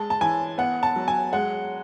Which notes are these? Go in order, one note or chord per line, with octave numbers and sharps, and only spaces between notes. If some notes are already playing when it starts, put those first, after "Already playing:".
Already playing: G#3 A5
A5
E3 G#5
B3 F#5
A5
F#3
G#5
G#3 F#5